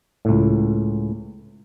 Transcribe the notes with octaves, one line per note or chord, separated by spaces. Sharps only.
C#2 A2